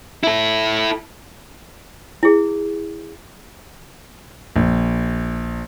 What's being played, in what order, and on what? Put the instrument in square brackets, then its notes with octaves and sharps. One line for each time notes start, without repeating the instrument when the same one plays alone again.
[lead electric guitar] E4 A4
[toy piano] E4 G#4
[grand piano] A#1